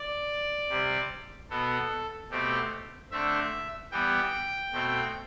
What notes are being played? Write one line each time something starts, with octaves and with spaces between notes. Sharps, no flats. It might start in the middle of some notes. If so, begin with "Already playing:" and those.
Already playing: D5
C3 G3 C4
B2 B3 A4
B2 A3 C4 G4
D3 A3 C4 E5
E3 G3 B3 G5
B2 A3 C4